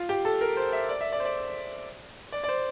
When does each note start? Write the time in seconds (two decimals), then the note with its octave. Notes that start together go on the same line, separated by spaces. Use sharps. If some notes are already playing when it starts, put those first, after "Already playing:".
Already playing: F4
0.09 G4
0.25 A4
0.41 A#4
0.57 C5
0.73 E5
0.89 D5
1.01 E5
1.13 D5
1.20 C5
1.25 D5
2.32 D5
2.44 D5
2.49 C5